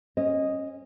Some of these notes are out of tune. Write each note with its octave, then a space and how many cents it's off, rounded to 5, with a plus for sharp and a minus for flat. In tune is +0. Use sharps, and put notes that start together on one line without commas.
C#4 -25 D#5 +0